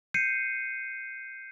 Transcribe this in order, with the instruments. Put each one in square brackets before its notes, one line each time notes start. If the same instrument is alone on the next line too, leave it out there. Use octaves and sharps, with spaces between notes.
[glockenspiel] G6 C7 C#7 D#7